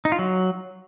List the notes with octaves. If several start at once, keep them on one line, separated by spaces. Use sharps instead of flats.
D#4
F4
F#3